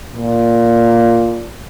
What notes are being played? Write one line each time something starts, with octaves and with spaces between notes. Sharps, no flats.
A#2